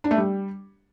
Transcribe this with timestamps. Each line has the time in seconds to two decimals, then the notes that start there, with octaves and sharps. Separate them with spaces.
0.04 D4
0.11 A3
0.17 G3